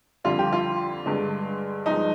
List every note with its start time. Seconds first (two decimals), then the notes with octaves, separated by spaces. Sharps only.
0.24 F2 D3 G3 F4
0.39 G4
0.52 F4
1.06 G2 D3 G#3
1.86 G2 F3 G#3 D#4